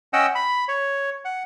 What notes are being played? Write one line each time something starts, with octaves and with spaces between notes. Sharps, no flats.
C#4 D#5 F#5 G5 E6
B5
C#5
F#5